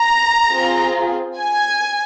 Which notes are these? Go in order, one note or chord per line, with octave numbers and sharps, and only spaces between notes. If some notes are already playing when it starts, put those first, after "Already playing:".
Already playing: A#5
C4 F4 G#4
G#5